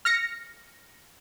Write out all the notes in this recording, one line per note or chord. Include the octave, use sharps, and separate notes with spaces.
F6 A#6 C#7